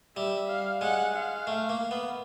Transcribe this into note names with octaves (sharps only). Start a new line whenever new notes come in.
G3 E5
F5
G#3 F#5
F5
A3
A#3
B3